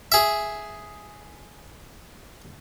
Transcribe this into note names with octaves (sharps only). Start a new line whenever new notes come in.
G#4 E5